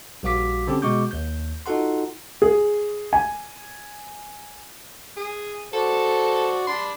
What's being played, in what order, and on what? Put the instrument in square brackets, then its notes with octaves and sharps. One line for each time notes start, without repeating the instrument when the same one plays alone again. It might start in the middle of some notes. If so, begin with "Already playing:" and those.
[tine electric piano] A#1 G3 F#4 F5 D6 B6
D3 C4 C#4 G4
B2 G#3 F#4 C#6 D6 G6
D#2 G6
D#4 F4 F#4 A4 F#5 C6
[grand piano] G#4
G#5
[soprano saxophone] G#4
[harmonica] F#4 C5 D5 [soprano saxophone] A4
[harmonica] D4 B5 [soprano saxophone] C6